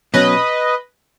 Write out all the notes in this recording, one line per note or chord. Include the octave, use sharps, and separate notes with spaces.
B2 F#3 C#4 B4 D#5